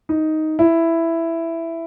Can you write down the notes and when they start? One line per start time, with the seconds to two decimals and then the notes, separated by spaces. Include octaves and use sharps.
0.09 D#4
0.59 E4